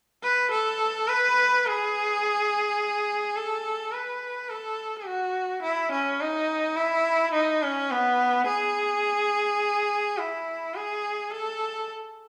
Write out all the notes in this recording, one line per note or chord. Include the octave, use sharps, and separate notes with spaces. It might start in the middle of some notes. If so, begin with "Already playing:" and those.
B4
A4
B4
G#4
A4
B4
A4
F#4
E4
C#4
D#4
E4
D#4
C#4
B3
G#4
E4
G#4
A4